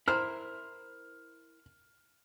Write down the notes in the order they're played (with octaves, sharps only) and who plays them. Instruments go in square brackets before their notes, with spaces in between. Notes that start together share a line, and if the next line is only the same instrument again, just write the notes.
[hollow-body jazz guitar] E4 A#4 C5 [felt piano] F6